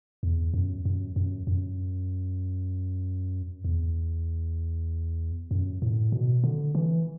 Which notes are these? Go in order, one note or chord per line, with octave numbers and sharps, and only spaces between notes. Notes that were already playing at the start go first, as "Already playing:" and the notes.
E2
F#2
F#2
F#2
F#2
E2
F#2
A2
B2
D3
E3